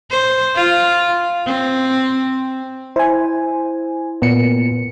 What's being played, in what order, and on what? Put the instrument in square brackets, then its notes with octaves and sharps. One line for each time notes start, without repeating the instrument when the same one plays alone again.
[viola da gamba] C5
F4
C4
[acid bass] E4 [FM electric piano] C5 G#5
[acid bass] A#2 [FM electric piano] B3 C#7